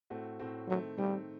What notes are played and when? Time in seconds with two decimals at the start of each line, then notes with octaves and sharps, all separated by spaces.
0.10 A2 A3 C4 F#4
0.40 A2 A3 C4 F#4
0.68 D#3 F#3 A3 C4
0.98 D#3 G3 A3 C4